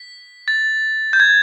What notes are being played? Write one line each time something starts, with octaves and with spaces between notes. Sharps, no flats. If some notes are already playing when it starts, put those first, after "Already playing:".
Already playing: B6
A6
G6
G#6